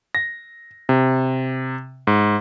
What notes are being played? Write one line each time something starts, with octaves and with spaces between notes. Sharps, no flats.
A#6
C3
G#2